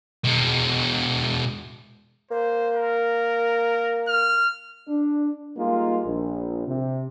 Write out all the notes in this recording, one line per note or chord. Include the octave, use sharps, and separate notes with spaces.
B2 G#3
A#3 C5
A#4
F6
D4
G3 G#3 A#3 D#4 F4
A#1
C3